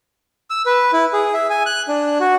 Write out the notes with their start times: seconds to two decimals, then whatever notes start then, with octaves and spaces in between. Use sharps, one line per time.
0.50 E6
0.66 B4
0.93 E4
1.13 G#4
1.34 E5
1.50 G#5
1.66 F#6
1.88 D4
2.20 F#4